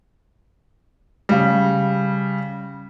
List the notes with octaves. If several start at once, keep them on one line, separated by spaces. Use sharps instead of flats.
C#3 G3